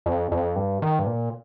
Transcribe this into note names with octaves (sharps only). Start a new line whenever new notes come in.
F2
F2
G2
D#3
G2
A#2